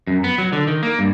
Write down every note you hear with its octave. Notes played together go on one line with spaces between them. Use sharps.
F#2
B3
F#3
D3
D#3
A#3
G2